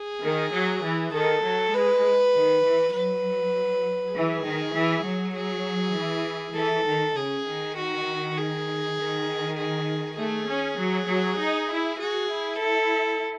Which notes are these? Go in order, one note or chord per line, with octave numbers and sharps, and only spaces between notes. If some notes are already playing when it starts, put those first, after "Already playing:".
Already playing: G#4
D#3
F#3
E3
D#3 A4
F#3
G#3 B4
D#3
E3
F#3 B4
E3 G#4
D#3
E3
F#3
G#4
E3
E3 A4
D#3
C#3 G#4
D#3
F#4
G#4
D#3
G#4
A3 G#4
C#4
F#3
F#3
D#4
E4
F#4 G#4
E4
A4